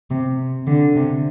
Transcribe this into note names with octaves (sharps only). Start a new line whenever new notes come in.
C3
D3
C3